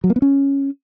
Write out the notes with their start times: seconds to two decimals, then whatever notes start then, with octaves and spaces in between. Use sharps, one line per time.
0.04 F#3
0.10 A#3
0.16 B3
0.22 C#4